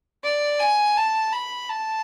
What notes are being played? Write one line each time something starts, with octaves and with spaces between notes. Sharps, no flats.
D5
G#5
A5
B5
A5